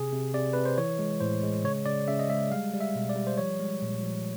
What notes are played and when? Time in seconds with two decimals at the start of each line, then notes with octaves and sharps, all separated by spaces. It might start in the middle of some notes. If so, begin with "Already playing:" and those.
Already playing: C3 G#4
0.12 C3
0.34 C3 D5
0.53 C3 B4
0.65 C5
0.78 E3 C#5
0.99 G#3
1.20 A2 C5
1.43 G#3
1.64 C#3 C#5
1.86 C#3 D5
2.08 C#3 E5
2.19 D#5
2.29 G#3 E5
2.51 G3 F5
2.73 G3
2.81 E5
2.95 B2
3.09 D5
3.16 G3
3.27 C5
3.38 F3 C#5
3.60 G#3
3.82 A#2
4.03 F3